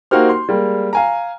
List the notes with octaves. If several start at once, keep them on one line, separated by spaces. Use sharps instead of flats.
A#3 D#4 F#4 G4 C5 F6
C6
G3 G#3 A#3
F5 G#5 A#5